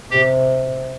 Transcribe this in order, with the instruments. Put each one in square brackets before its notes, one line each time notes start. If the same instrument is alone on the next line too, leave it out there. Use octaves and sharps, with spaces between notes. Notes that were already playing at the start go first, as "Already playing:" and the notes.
[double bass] C3 [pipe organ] G4